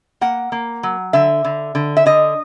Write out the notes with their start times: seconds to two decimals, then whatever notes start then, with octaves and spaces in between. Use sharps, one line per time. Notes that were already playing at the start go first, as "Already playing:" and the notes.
0.21 A#3 F#5
0.52 A#3
0.83 F#3
1.13 D3 E5
1.45 D3
1.75 D3
1.97 E5
2.06 D3 D#5